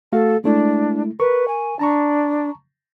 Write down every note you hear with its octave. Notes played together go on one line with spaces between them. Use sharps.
A3 F#4 A4 F5
G#3 A3 D4 E4
A#4 B4 C#6
G#5
D4 A5 A#5 C#6